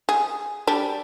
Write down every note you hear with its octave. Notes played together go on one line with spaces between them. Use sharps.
G#4
G3 D4